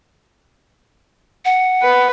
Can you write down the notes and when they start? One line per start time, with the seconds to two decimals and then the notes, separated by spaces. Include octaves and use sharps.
1.45 F#5
1.82 B4